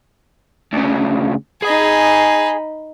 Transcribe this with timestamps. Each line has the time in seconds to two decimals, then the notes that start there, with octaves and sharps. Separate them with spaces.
0.73 D2 C#3
1.63 D#4 G#4 G#5 B5